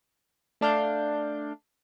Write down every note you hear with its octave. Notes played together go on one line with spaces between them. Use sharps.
A3 D4 F5 G6